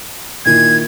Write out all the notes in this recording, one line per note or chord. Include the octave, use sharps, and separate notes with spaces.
A#2 D#3 E4 G#6